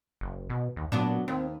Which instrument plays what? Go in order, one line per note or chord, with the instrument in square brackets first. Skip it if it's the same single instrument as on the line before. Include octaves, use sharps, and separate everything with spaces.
[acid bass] F#1
B2
D#2
[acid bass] A#2 [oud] F#3 B3 D4
[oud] D#2 [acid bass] C4